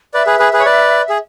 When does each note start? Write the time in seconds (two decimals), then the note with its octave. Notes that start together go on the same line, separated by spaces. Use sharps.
0.14 B4 D5 E5
0.26 G#4 B4
0.39 G#4 B4
0.53 G#4 B4
0.60 C#5
0.65 B4 D5
1.09 G#4